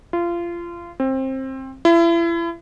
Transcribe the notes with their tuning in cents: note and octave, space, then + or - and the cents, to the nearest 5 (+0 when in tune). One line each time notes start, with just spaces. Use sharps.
F4 -25
C4 +20
E4 +35